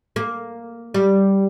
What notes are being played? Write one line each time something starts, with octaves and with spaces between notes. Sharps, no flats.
A#3
G3